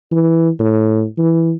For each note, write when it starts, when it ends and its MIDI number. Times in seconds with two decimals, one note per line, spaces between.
0.12 0.50 52
0.59 1.05 45
1.18 1.54 52